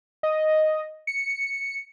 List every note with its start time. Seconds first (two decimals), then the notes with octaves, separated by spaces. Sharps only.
0.23 D#5
1.07 C#7